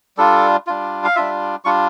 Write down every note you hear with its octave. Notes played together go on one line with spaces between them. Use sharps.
G3 D4 F4 A4
G3 D4 F4
F5
G3 D4 F4 E5
G3 D4 F4 C#6